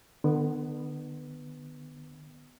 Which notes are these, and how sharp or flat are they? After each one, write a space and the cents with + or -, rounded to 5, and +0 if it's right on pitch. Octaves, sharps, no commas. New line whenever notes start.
D3 +40 B3 +0